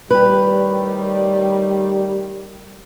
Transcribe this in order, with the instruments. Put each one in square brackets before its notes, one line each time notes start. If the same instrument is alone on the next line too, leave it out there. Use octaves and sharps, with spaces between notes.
[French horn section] A2 D#3 G3 [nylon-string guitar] G4 B4